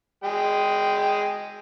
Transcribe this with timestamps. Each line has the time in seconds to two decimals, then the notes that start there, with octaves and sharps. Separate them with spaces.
0.24 G#3 G5